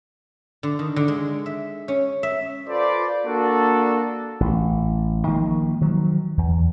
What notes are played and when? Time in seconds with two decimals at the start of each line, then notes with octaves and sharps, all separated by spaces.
0.63 D3
0.79 D#3
0.96 D3
1.08 G#3
1.46 E5
1.88 C#4
2.23 E5
2.68 F4 A4 B4 C5 D5
3.25 A#3 D4 F#4 A4
4.40 A1
5.27 D#3 F3 G#3 A#3
5.81 D#3 F3 F#3
6.37 E2